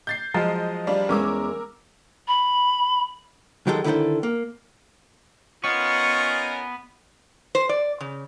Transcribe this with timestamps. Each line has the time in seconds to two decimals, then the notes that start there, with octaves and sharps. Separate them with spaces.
0.07 G6 A6 C7
0.34 F3 F#3 G#3 D#5
0.87 G3 D4 F4
1.09 E2 G#3 C#4 A#4 D6 E6
2.28 B5
3.67 D#3 F#3 G#3 G4 A4
3.84 D3 D#3 E4 G#4 A4 C5
4.23 A#3
5.64 B3 C#4 D#4 F4 A#4 C#6
7.55 C5
7.69 D5
8.01 C#3